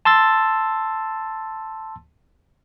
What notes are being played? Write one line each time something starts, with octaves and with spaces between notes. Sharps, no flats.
A5 C6 E6 A6